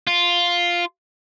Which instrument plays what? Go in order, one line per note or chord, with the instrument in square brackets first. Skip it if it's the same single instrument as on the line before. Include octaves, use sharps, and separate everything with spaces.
[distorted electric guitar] F4